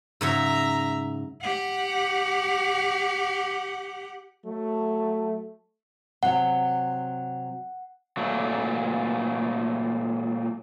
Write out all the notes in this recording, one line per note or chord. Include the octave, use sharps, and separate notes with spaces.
G#2 C#3 F#3 E5 A#5
G4 F#5
F#3 A3
C3 F#3 F#5
A#2 F#3 A3